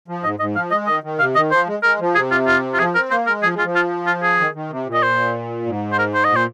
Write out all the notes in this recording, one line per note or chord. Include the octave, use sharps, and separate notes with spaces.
F3
G#2 D#5
G#2 D#5
F3 F5
G#3 D#5
D#3 D#5
D#3
C3 F5
D#3 D#5
F3 C5
G#3
G#3 A#4
F3
C3 G#4
F4
F4
F4
F3 G#4
C4 A#4
A#3 C5
G#3 A#4
F3 G#4
G#3
F4
F3
F4
F4
G#4
D#3
D#3
C3
A#2
D#5
C5
G#2
C5
A#4
C5
D#5
A#2
C5